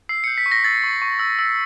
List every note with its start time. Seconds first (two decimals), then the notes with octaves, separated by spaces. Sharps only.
0.09 E6 C7
0.24 G6 C#7
0.38 B6
0.46 C#6
0.52 A#6
0.64 E6 A6
0.84 C#6
1.02 C#6
1.19 E6
1.39 E6